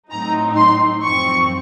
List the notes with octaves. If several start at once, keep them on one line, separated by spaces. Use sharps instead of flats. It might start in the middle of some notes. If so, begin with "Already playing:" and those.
A2 F#3 C4 D#4 A#5
C6
F#2 F3 C4 C#6